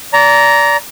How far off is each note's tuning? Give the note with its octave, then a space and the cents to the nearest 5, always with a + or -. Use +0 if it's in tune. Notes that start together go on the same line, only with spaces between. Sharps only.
D5 -30 A#5 +0